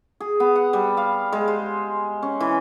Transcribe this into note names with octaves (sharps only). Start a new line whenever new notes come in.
G#4
B3
F#5
G3
F5
G#3
C5
C#4
E3